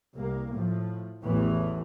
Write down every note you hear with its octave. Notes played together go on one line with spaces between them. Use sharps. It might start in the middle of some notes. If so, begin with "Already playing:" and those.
C2 A#3
A2 F3
A1 E2 A2 E3